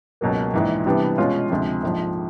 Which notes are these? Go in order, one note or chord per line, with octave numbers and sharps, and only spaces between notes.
C#2 B2 F#3 A#3
A#1 G#2 E3
C3 E3 G3 B3 D4
B2 G#3 C#4 F4
D2 C3 F3 G#3 C4
A#1 G#2 F3